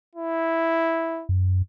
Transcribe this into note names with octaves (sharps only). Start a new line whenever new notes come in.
E4
F#2